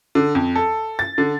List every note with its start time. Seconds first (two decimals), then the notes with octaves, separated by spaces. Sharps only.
0.15 D3
0.35 F2
0.56 A4
0.99 A6
1.18 D3